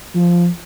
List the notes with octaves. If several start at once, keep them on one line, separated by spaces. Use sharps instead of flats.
F3